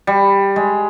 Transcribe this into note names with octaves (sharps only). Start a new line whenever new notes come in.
G3
G#3